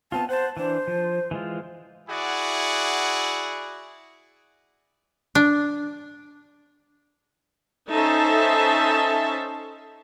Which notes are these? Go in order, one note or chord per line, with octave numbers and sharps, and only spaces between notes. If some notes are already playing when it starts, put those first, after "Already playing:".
B3 C4 F4 A5
C5 F#5 A5
E3 D4 C5
F3
E3 G#3 F4
E4 F#4 G#4 D5 F#5
D4
C#4 D#4 A4 C5 E5 A5